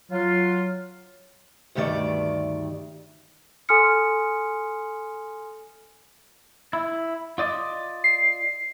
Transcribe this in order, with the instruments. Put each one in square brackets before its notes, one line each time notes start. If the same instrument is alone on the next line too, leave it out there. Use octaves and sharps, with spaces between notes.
[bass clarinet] F#3 [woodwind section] F4
[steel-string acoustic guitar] D2 G2 D#3 A3 D5
[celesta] A4 G#5 C6 D#6 F6 C#7
[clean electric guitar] E4
F4 D5 D#5
[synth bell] C7